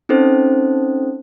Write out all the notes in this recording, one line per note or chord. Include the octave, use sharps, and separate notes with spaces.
C4 C#4 D#4 A4 C5